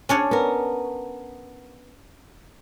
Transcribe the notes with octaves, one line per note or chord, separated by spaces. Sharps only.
C#4 D4 C#5
B3 A#4